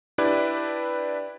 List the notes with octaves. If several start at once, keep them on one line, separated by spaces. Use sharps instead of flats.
D4 E4 G4 B4 D5